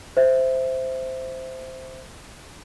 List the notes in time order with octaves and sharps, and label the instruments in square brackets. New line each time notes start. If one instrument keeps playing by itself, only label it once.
[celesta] C5 E5